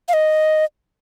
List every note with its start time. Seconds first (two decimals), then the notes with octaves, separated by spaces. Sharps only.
0.09 F5
0.13 D#5